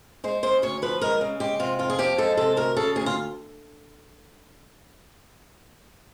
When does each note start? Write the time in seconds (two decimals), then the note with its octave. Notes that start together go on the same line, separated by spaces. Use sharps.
0.24 G#3 C5
0.43 C#3 C5
0.62 D2 C#5
0.82 F3 B4
1.01 G#3 A#4
1.21 C#3
1.40 G#3 G4
1.59 C3 F4
1.79 F2 F4
1.90 G#4
1.98 F3 G4
2.18 G#3 A4
2.37 C3 A4
2.56 D2 A#4
2.76 C#3 A4
2.96 D2 G#4
3.06 F4